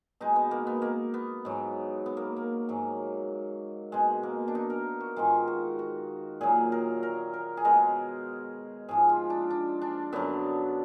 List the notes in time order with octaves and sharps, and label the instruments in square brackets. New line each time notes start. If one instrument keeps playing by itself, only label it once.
[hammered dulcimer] B2 G#3 D#4
B3
A#3
B3
A#3
B3
G#2 F#3
B3
A#3
A#3
G#2 F#3
B2 G#3
A#3
D4
D#4
A#4
F#4
G#2 D#3 G#3 F4
F#4
F#4
A#2 F#3 G#4
A#4
A#4
A#4
G#4
B2 G#3 A#4
G#2 F3 G#3 G#4
F4
D4
D4
D4
F#2 D3 F#3 B3